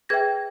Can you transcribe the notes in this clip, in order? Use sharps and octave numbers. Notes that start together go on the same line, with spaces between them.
G#4 B4 E5 G5 G#6 A#6